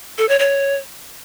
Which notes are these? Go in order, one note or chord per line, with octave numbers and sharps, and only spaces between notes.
A4
C#5
C#5